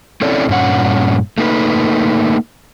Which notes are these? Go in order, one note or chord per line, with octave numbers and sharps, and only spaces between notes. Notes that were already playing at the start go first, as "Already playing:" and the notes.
C4 C#4 E4 A4 C#5 D5
G2 A#2 C#4 F#5
A3 A#3 D#4 B4